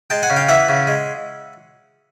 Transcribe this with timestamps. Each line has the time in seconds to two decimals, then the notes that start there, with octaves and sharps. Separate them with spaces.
0.10 G#3 G5 A5
0.23 F#5 G#5
0.30 C#3
0.36 F5 G5
0.49 E3 E5 F#5
0.69 C#3
0.87 G#3